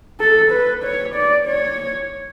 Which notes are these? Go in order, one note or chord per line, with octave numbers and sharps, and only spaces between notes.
A4
B4
C#5
D5
C#5